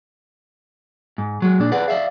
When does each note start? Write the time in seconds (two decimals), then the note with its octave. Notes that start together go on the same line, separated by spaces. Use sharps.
1.18 G#2
1.42 F#3 G#3
1.59 A#2 D4
1.72 G#4 B4 D5 F#5
1.88 D5 E5 F5